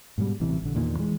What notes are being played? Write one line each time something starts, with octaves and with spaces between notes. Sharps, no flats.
G#2 B2 D#3 G3
A1 C3 E3
A#1 D3
E2 A#2 D#3
E3 G#3